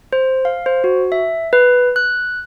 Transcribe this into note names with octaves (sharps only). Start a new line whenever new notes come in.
C5
F5
C5
F#4
E5
B4
F#6